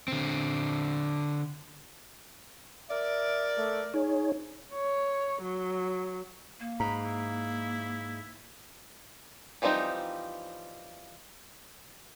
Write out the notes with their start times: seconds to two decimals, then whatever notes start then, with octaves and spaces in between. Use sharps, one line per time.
0.08 D3 C4
2.90 A#4 D5 E5
3.57 A3
3.94 D#4 G#4 C#5
4.74 C#5
5.42 F#3
6.60 A#3
6.80 G#2 A#5 B5
7.05 E4
9.62 E3 F3 G3 C4 D#4